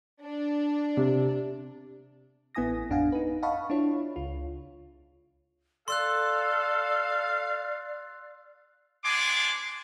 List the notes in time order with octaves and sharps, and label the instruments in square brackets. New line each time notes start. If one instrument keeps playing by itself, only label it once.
[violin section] D4
[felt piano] C3
[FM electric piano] A1 B3 E4 G#5 D#6 A#6
A1 F2 D4 F5 F#5 G#5
D#4 B4
D#5 F5 F#5 A5 B5 C#6
D4 E4 F4 C#5
C#2 F4
[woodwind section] A4 [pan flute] D5 [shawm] F5 [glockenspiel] C6 E6 F#6
[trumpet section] G#3 B3 D4 G#5 C6 D6